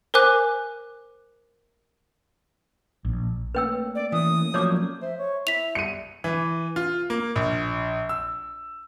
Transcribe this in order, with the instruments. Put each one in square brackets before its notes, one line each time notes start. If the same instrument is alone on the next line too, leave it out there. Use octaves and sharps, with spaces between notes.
[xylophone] A#4 C5 G#5 D6 F#6
[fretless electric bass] A#1
[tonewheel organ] A3 A#3 C#4 [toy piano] B4 G5 E6
[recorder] D5
[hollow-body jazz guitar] E3 [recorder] D#6
[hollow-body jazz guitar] F3 F#3 [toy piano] C#5 D5 D6
[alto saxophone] C5 [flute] E5
[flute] C#5
[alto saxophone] E4 [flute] E5 [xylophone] B6 F7
[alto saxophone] G3 [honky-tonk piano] C#7 D#7
[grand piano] E3
F4
A#3
A#1
E6